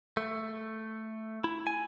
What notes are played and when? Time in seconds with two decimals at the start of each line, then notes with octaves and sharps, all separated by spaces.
0.17 A3
1.44 E4
1.67 G#5